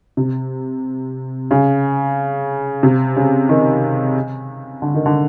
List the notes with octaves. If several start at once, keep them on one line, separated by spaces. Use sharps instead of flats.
C3
C#3
C3
C#3
D#3
D3
D#3
D3